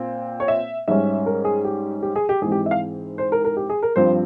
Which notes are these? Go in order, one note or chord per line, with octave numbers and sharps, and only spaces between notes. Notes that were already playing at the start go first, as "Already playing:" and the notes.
Already playing: A#2 C4
C#5
E5
G#2 G3 C#4 E5
A#4
G#4
G4
G4
G#4
G4
G#2 E3 G#3 C4 G#4
G4
E5
F5
C5
A#4
A#4
G4
G#4
A#4
G2 F3 C4 C5